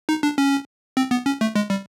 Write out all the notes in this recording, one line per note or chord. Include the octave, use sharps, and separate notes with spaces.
D#4
D4
C#4
C4
B3
C#4
A3
G#3
G3